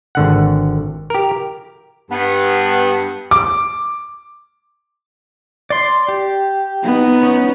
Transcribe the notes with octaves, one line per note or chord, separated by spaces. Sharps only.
G#1 D3 F#5
G4 A#4
G2 B3
D6
D5 C6
G4
B3 D#4
C#4